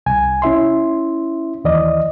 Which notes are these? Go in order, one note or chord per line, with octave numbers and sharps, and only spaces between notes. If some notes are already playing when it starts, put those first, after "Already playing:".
C2 G#5
C#4 E4 E5 C6
D#2 E3 D5 D#5